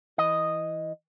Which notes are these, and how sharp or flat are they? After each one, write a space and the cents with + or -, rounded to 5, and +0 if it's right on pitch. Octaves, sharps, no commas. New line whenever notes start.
E3 +0 D#5 +0